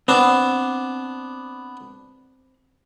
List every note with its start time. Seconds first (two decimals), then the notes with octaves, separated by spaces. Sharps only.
0.08 B3 C4 D4 A5